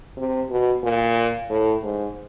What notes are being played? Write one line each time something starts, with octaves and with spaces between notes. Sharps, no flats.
C3
B2
A#2
A2
G#2